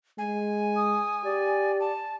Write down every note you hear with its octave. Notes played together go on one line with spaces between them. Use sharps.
G#3 G#5
D#6
G4 D5
A5